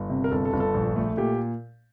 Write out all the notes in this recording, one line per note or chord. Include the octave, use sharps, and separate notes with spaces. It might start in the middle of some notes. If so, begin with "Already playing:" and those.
Already playing: G1
C3
A#4
G1 A4
A4
G1
A4
A#1
A3
A#2 G4